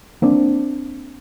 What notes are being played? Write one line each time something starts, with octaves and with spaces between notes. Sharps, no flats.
A#3 C4 D4